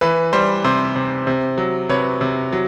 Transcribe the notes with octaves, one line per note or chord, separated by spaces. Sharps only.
E3 B4
G3 C5
C3 C5
C3
C3
F#3
C3 B4 C#5
C3
F#3